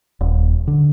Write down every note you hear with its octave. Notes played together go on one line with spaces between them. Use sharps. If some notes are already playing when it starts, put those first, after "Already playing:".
D#1
D3